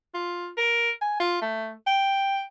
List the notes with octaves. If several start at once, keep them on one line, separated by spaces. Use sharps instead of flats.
F4
A#4
G#5
F4
A3
G5